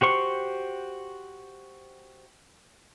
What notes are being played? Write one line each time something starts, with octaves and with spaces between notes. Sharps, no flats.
F#4 G4 C5 C#6